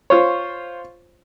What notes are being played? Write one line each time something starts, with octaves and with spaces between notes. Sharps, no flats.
F4 C5 C#5